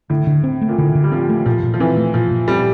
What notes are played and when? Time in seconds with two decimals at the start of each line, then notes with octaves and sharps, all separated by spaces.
0.10 A2 D3
0.27 D3
0.44 C4
0.62 A3
0.68 A#2
0.78 A2 D3
0.95 D3
1.04 G3
1.12 F3 C4
1.29 A3
1.46 A#2 F3
1.63 A#2
1.74 F3
1.80 E3 C4
1.97 A3
2.14 A#2 F3
2.31 A#2
2.48 G3 C4